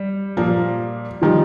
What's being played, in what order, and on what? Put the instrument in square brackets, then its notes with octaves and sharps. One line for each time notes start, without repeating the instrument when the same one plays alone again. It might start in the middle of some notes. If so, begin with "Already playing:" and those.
Already playing: [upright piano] G3
[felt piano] A#2 F3 A#3
[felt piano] D#3 G3 [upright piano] F3